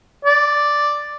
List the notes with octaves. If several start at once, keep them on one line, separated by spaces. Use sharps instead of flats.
D5